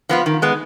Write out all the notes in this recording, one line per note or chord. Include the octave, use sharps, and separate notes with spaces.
F3 B3 F4
D#3
G#3 B3